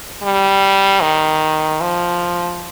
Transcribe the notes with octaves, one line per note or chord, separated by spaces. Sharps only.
G3
D#3
F3